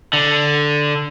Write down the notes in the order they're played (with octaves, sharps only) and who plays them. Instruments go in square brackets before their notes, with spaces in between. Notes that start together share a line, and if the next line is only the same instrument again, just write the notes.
[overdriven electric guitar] D3